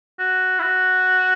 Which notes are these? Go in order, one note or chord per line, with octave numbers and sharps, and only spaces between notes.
F#4
E4
F#4